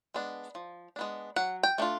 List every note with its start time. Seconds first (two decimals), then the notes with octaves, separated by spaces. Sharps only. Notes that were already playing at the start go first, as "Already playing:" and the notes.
0.14 G#3 B3 D4
0.55 F3
0.96 G#3 B3 D4
1.36 F#3 F#5
1.63 G5
1.78 A3 D4 F4